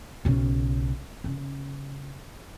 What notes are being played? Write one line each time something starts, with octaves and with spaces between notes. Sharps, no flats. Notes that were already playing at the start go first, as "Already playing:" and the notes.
B1 C#3
C#3